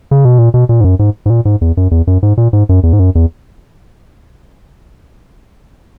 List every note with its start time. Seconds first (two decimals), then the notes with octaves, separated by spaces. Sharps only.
0.11 C#3
0.25 B2
0.38 A#2
0.54 B2
0.69 A#2
0.81 G#2
0.84 F#2
0.99 G#2
1.26 G#2
1.30 A#2
1.45 G#2
1.61 E2
1.77 F#2
1.91 E2
2.07 F#2
2.23 G#2
2.37 A#2
2.53 G#2
2.69 F#2
2.83 E2
2.93 G#2
2.99 F#2
3.15 E2